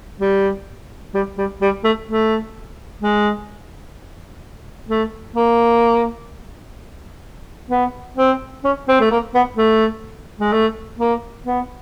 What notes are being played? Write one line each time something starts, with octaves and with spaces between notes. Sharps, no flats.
G3
G3
G3
G3
A3
A3
G#3
A3
A#3
B3
C4
C#4
C4
A3
A#3
B3
A3
G#3
A3
A#3
B3